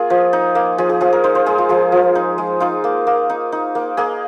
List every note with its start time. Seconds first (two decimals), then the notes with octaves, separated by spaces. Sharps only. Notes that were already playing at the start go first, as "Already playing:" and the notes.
Already playing: A#3 F4 G#4
0.10 F3
0.33 D#4
0.55 A#3
0.78 F3 G#4
0.89 G#4
1.01 F3 G#4
1.13 A#4
1.24 D#4 C5
1.35 C5
1.46 G#3 G#4
1.58 F4
1.69 F3 G#4
1.92 F3
2.15 D#4
2.38 G#3
2.60 D#4 F4
2.84 A#3
3.07 A#3
3.30 D#4
3.52 D#4
3.75 A#3
3.97 A#3 G#4